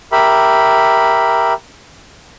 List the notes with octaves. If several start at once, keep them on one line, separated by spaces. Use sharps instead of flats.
G4 A#4 E5 B5